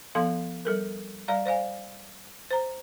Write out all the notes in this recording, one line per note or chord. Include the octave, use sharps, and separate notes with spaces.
F3 B3 A4 F5 C6
G3 A4 A#4
G3 D5 F5 A#5
C5 D5 F5 G#5
C5 A#5